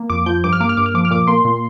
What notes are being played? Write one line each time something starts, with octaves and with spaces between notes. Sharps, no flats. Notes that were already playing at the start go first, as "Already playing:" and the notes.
Already playing: A#3
F2 D6
F3 G6
G2 D6
F6
A#3 D6
F6
G2 D6
F6
F3 D6
F6
A#2 D6
A#3 C6
A#2